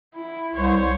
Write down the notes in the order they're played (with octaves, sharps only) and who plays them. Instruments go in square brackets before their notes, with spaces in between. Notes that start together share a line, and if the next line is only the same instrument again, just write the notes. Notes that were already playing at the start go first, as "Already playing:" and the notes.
[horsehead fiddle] E4
[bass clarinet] C2 [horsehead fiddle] C5 C#5